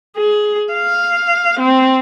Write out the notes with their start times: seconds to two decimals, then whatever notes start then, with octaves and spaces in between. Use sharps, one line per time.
0.17 G#4
0.73 F5
1.59 C4